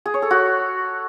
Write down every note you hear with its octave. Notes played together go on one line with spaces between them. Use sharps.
G#4
C#5
A4
F#4